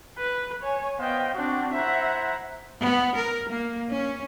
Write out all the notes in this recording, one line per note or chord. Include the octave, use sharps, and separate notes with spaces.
B4
C#5 G#5
B3 C5 D#5 F5 G5
C4 D4 F#4
E4 C5 E5 F#5 A#5
B3
A#4
A#3
C#4